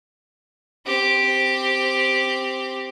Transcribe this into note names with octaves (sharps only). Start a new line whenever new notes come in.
C4 G4